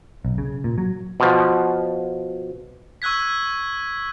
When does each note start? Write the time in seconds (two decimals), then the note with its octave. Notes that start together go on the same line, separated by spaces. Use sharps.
0.25 B1
0.38 C#3
0.64 A#2
0.78 F#3
1.20 B2 F3
3.02 C#6 E6 F#6 G#6 B6